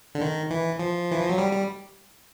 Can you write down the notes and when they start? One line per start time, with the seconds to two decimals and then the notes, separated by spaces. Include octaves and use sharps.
0.15 D3
0.21 D#3
0.51 E3
0.79 F3
1.11 E3
1.20 F3
1.29 F#3
1.38 G3
1.53 G3